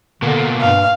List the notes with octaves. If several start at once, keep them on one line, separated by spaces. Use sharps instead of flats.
B2 D3 A#3
G2 F5